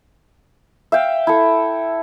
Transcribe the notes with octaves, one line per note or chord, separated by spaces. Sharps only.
E5 F5 G5
E4 A4